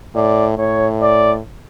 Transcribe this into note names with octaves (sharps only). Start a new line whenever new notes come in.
A2 D5
A2 C#5
D5